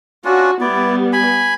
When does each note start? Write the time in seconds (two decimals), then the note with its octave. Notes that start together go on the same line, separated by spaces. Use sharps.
0.25 C#4 D4 F4 F#4
0.61 G3 B3 E4 D5
1.13 G#5 B5